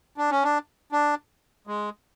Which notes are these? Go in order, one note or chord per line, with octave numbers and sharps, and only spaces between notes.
D4
C#4
D4
D4
G#3